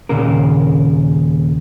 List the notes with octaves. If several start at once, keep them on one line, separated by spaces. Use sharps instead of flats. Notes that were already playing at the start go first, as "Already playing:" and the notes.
D#2 A#2 C#3 A#4